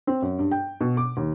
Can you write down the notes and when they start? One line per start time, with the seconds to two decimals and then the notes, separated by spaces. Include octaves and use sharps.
0.07 C4
0.22 F#2
0.39 G2
0.51 G5
0.81 B2
0.97 D6
1.17 D#2